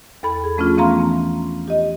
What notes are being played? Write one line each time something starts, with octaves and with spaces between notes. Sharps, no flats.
E2 A4 B5
G#4
F3 A3 C#4 D4 F4
E3 B3 C#4 F5 A#5 C6
G4 D#5